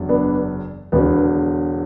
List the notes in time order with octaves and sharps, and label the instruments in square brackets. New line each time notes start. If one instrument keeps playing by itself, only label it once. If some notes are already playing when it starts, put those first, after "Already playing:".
Already playing: [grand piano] F#1 E2 D3
B3 D4
E1 E2 D3 B3